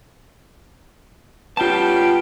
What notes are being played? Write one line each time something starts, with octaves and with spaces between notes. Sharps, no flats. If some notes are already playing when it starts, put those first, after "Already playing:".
G3 B3 C#4 F4 G5 A5